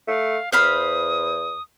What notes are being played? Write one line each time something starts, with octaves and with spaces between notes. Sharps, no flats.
A3 F5
E2 C5 F5 B5 D#6